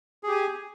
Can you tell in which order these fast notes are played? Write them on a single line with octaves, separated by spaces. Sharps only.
G#4 G4 G#5